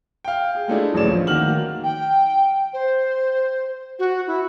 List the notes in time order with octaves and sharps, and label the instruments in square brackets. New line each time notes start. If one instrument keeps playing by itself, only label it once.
[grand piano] F5 G5
G#4
G#3 A3 D4 E4
D1 A1 C#5 D5 E7
F3
D#3 A#3 F#4 F6 F#7
[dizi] G5
C5
F#4
E4